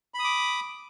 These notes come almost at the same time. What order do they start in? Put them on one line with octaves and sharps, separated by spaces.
B5 D#6 D6